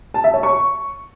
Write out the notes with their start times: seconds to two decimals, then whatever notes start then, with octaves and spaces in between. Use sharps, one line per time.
0.14 A5
0.24 E5
0.34 C#5
0.43 C#6